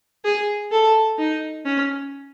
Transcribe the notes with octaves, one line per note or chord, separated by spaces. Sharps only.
G#4
A4
D#4
C#4